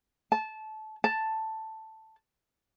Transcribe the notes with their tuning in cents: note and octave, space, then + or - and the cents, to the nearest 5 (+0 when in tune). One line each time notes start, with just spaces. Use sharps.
A5 -20
A5 +5